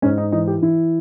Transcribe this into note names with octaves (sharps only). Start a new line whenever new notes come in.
G#2 C#4
D#4
E3 D#4
G4
E3 E4